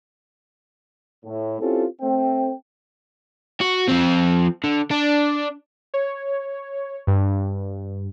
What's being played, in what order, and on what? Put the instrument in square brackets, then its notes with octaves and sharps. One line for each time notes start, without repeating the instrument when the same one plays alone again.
[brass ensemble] A2
C4 C#4 E4 F4 G4 A4
A3 C4 G5
[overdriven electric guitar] F#4
F3 C4
D3
D4
[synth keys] C#5
G2